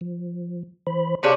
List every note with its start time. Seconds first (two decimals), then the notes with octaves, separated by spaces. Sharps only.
0.01 F3
0.87 E3 C5 B5
1.23 C3 C#4 D4 G#4 C#5 F5